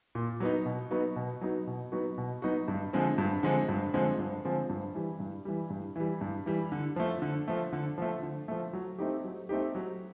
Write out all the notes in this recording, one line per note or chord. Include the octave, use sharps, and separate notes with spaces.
A#2
F#3 B3 D#4
B2
F#3 B3 D#4 F#4
B2
F#3 B3 D#4 F#4
B2
F#3 B3 D#4 F#4
B2
F#3 B3 D#4 F#4
G2
D3 F3 G#3 C4
G2
D3 F3 G#3 C4
G2
D3 F3 G#3 C4
G2
D3 F3 G#3 C4
G2
E3 G3
G2
E3 G3
G2
E3 G3
G2
E3 G3
D3
F3 A3
D3
F3 A3
D3
F3 A3
D3
F3 A3
F#3
A3 C4 D#4 G4
F#3
A3 C4 D#4 G4
F#3